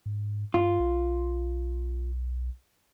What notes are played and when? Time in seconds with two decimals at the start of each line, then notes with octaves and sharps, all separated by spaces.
0.06 G#2
0.54 G2 F4
0.79 B1